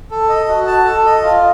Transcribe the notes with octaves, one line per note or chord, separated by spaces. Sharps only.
A4
D#5
F#4
A5
A4
D#5
F4